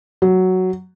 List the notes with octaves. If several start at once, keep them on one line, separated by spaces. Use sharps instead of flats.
F#3